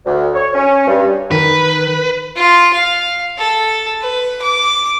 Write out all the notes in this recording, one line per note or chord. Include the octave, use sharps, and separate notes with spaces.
D2
C#5
C#4
G2
D#3 B4
F4
F5
A4
B4
D6